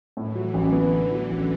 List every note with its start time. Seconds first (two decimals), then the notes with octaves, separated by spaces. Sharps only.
0.17 A2 E3
0.35 F#3
0.54 A1 D3
0.72 B3
0.92 A2 E3
1.11 F#3
1.30 A1